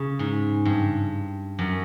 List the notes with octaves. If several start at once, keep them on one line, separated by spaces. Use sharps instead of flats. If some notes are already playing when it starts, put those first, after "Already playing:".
Already playing: C#3
G#2
G2
F#2